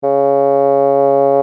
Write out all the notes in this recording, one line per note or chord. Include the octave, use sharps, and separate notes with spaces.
C#3